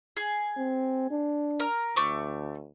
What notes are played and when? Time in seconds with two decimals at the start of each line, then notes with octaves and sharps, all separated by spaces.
0.17 G#4
0.57 C4
1.11 D4
1.60 A#4 A#5 F6
1.96 D2 A3 C#6 D6